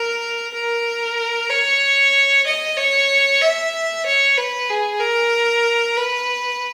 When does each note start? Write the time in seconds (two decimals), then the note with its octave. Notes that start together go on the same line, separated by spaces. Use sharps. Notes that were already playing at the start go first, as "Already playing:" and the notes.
Already playing: A#4
0.54 A#4
1.50 C#5
2.46 D#5
2.77 C#5
3.41 E5
4.06 C#5
4.38 B4
4.70 G#4
5.01 A#4
5.97 B4